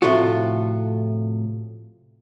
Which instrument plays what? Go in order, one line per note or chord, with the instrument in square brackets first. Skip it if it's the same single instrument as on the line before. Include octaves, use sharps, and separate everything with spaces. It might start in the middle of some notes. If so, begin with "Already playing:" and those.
[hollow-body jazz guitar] A2 C3 F3 A3 F4 F#4